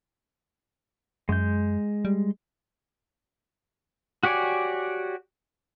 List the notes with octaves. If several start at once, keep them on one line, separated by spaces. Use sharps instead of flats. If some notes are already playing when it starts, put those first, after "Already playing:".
F#2 G#3 G6
G3
F#4 G4 C#5 D5 G#5